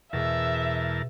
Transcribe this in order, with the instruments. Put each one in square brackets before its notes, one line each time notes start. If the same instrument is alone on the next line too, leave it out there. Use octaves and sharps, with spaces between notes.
[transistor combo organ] E2 A#4 A5 [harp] B2 G#4 [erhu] E5